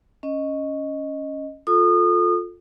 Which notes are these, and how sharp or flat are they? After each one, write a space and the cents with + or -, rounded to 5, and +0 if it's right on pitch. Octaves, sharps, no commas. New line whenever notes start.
C#4 +0 D#5 +0
F4 +20 A4 +0 D#6 -30